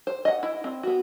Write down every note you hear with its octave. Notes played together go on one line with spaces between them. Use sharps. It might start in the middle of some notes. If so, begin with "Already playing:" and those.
C5
D#5 F#5
E4
C4
B3 F#4